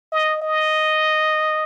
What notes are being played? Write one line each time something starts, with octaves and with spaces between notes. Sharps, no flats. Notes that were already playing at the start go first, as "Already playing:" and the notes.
D#5
D#5